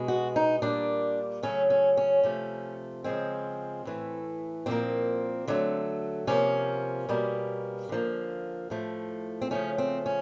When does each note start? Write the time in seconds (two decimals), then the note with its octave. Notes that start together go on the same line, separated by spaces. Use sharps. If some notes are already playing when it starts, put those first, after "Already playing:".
Already playing: B2 G#3
0.08 F#4
0.36 D#4
0.62 A#2 G3 A#3 D4
1.43 C#3 F#3 A3 C#4
1.70 C#4
1.97 C#4
2.23 C3 F3 A3
3.04 C#3 F3 G#3 C4
3.85 A2 E3 A3
4.66 A#2 F3 A#3 C4
5.48 D3 F#3 A3
6.27 C3 F3 A#3 C#4
7.09 B2 G3 A#3
7.89 D3 F3 A#3
8.70 A2 F3 A3
9.42 C4
9.51 C#3 F3 A3 C#4
9.78 C4
10.06 C#4